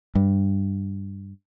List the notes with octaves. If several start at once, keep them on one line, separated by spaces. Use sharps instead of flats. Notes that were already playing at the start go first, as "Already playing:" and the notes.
G2